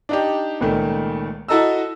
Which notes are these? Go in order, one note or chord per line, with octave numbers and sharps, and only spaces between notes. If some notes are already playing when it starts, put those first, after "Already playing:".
D4 D#4 G4
C#2 A#2 D#3 A3
E4 F#4 A4 D#5 A#5 E6